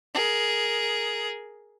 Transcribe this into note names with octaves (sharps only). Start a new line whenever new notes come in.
G#4 A#4